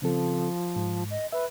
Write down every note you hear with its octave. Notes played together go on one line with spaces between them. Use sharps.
C#3 F3 C4 A4
G#2
D#5
B4 E5